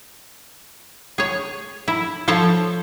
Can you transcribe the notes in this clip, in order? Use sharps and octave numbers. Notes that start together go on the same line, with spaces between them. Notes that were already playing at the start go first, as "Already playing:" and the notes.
G#4 C#5
E4
F3 A4 C5 C#5